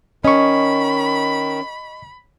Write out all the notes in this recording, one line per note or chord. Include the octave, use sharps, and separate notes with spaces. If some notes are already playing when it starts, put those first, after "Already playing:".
D#3 C#4 D#5 B5 C#6